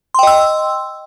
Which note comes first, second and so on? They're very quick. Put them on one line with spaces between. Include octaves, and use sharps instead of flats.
C6 G5 D#5 E6